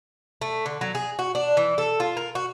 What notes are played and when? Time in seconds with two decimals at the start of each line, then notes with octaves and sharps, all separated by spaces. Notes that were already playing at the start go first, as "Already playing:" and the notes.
0.41 A3
0.66 D3
0.81 F#3
0.95 G#4
1.19 F#4
1.35 D4
1.57 E3
1.78 A4
2.00 F4
2.17 A#4
2.35 F#4